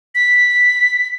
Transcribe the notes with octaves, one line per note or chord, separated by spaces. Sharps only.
B6